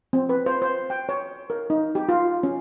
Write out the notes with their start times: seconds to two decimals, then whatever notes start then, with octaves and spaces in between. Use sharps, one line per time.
0.13 C4
0.29 B4
0.46 C5
0.62 C5
0.90 G5
1.09 C#5
1.50 A#4
1.70 D#4
1.95 G4
2.09 F4
2.43 C#4